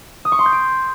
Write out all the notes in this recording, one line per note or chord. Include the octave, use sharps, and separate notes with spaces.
D#6
C#6
C6
G6
D7